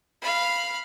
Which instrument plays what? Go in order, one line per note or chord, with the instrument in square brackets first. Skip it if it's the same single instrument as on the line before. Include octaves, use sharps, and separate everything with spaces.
[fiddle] F5 B5